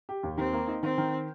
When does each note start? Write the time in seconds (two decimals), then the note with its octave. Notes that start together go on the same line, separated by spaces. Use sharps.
0.09 G4
0.23 D#2
0.37 D#3 C4
0.53 A#3
0.68 D#4
0.83 D#3 C4
0.98 D#3